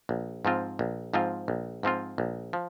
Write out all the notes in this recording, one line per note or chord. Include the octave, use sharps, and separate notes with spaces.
A#1
G#2 F3 C4 F4
A#1
G#2 F3 C4 F4
A#1
G#2 F3 C4 F4
A#1
F3